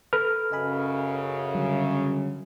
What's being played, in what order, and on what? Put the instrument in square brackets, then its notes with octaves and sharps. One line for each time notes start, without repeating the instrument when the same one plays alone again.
[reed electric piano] A4 B4 F6
[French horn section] F#2 C#3 [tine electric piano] D#5 G#5 B5
[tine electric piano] D3 F#3 G3